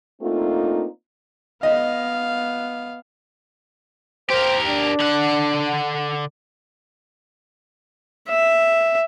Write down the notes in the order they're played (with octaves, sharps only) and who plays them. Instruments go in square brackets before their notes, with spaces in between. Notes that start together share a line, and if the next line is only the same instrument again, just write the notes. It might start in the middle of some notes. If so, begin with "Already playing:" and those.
[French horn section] A3 A#3 C4 D4 D#4 F4
[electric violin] B3 F5 [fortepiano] D#5
[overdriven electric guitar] G4 A#4 [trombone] C5
[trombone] D4
[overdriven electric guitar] D3 F#5
[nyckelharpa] E5